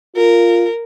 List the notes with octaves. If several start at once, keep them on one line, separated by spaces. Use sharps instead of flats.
F4 A#4